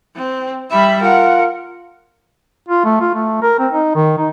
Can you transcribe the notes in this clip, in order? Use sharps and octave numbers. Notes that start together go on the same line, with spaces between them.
C4
G3 E5 B5
F4 A#4 F#5
F4
A3
F4
A3
A#4
C4
D#4
D#3
D#4